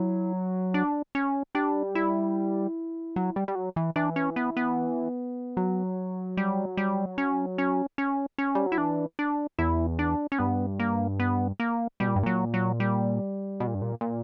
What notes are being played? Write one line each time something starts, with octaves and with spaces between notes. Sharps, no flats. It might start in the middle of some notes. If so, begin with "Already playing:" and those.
Already playing: F#3 E4
D4
C#4
G3 D4
E4
F#3
G3
G3
F#3
E3
E3 D4
C#4
B3
B3
F#3
G3
G3
C#4
C#4
C#4
C#4
G3
F#3
E4
E3 D4
D4
E2 E4
D4
C#4
G2 B3
A#3
B3
A#3
B2 G3
A#2
G2
A#2 F#3
F#3
G3
B2
A#2
G2
A#2
A#2